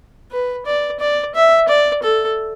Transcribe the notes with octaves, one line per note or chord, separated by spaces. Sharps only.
B4
D5
D5
E5
D5
A4